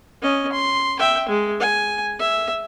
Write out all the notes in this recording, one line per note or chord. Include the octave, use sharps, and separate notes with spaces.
C#4 D#5
C6
E5 G5
G#3
G#5
E5